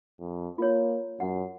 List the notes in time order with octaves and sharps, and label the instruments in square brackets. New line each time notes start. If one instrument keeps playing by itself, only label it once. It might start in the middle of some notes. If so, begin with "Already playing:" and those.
[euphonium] F2
[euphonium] A#3 [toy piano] F4 C#5
[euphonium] F#2 [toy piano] F#5